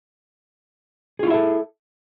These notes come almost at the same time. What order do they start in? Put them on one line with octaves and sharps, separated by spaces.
G#4 F4 E4 E5 A4